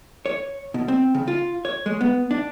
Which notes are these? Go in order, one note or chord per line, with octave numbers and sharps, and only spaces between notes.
C#5
B2
C4
C#3
F4
C#5
G#3
B3
D4